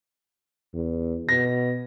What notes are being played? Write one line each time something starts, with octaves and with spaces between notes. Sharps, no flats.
E2
B2 A#6